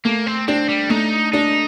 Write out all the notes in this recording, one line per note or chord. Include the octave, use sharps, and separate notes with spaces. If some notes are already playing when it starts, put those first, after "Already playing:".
A3 A#3
C4
C4 D4
G3
A3 D#4
D4 D#4